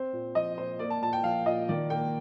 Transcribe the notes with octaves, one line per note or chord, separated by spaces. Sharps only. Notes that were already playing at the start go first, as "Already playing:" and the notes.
Already playing: C4 C5
A#2
F3 D#5
A#2 C5
A#3 D5
A5
A#2 A5
G5
F3 F5
A#2 D#5
D#3 D5
A#3 G5